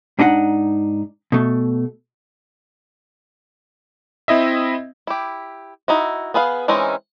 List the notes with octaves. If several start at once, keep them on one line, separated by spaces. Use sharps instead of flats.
G#2 D4 D#4 G#4 F#5
B2 A3
C4 E4 D#5 E5
E4 G4
D#4 E4 F#4
B3 G#4 B4 F5
E3 G#3 C4 C#4 D#4